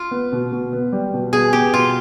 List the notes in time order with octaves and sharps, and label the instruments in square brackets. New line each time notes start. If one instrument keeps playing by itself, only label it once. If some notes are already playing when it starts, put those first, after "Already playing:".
Already playing: [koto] F4
[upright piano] B3
B2
B2
B3
G3
B2
[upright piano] B2 [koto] G#4
[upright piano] B3 [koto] G4
[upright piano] B2 [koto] F4